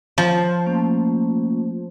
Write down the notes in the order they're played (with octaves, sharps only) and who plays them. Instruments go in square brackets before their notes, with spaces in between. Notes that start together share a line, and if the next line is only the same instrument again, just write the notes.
[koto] F3
[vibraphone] A3 A#3 C#4